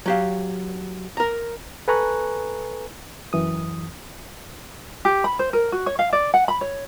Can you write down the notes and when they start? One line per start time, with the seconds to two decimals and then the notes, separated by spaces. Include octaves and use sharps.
0.06 F#3 G4 F5
1.17 A#4 A#5
1.88 A4 B4 G#5 A#5 C#6 F#6
3.33 F#2 E3 D#6
5.05 G4
5.24 B5
5.39 C5
5.53 A#4
5.72 F#4
5.86 C#5
5.99 F5
6.13 D5
6.34 F#5
6.48 B5
6.61 C#5